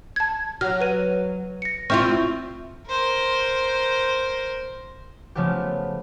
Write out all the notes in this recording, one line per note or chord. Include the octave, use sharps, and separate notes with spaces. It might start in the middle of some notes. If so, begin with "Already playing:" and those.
A5 G#6
F#3 F6
B4 D#7
A#6 C#7
C4 E4 F4 C#6 F6
A#4 C5
C#3 F3 A3 B3 G4